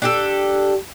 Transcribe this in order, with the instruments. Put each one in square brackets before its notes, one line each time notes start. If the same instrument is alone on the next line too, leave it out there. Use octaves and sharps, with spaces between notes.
[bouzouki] D4 G4 A4